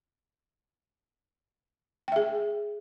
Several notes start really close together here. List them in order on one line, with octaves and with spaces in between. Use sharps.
G5 E5 G#4